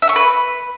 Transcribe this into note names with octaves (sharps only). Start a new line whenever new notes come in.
E5
C#6
B4